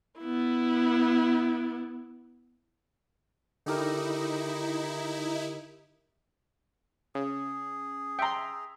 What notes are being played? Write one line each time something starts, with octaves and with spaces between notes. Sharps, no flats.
B3 E4
D3 D#4 E4 G4 A#4
C#3 G#4
E5 G5 A#5 C6